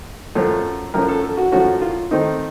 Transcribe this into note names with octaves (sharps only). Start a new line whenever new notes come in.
F#2 F3 A3 C#4
F#2 F3 A3 C#4 A#4
A4
A4
F#4
F#2 F3 A3 C#4 F#4
F4
D#3 A3 C4 D#4